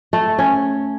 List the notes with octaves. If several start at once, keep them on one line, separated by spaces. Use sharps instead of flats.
A3
C#4